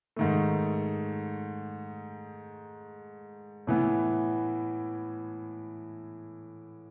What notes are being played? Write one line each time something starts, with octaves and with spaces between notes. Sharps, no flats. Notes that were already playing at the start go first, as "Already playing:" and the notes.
G#2 D#3 A3
A2 E3 B3